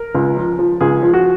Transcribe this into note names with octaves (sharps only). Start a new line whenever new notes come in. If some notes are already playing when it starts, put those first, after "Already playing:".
Already playing: A#4
C#2
F3
F3
C#2 G#4
F3
F#4